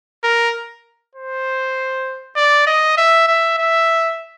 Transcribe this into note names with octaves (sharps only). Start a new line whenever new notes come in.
A#4
C5
D5
D#5
E5
E5
E5